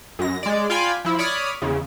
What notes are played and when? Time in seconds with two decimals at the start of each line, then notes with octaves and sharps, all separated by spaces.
0.19 F#2 A#6
0.43 G#3 D5
0.70 F4 D5 F5 G5 G#5 B5
1.05 F3 E4
1.19 C#5 D5 B5 D#6 F6
1.62 E2 C#3